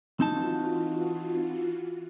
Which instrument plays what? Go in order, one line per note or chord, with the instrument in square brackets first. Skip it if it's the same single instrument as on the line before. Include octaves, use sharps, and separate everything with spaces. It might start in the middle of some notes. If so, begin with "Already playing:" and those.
[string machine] E3 F4 F#4 [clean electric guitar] C4 D#4 A5